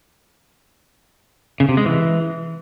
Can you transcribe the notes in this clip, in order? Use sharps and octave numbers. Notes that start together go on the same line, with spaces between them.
C#3
C3
G#3
E3